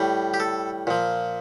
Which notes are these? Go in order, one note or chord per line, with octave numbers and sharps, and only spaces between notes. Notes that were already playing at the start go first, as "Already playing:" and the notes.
Already playing: A2 G3
G4
A4
A#2 F3